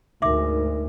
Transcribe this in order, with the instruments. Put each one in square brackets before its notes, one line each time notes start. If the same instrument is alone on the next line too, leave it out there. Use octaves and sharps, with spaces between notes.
[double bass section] D2 G#2 [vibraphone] D#4 A#4 [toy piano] E5 D6